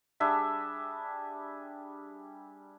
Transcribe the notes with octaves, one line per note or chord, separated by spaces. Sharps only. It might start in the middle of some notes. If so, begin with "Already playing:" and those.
G3 D4 G#4 E5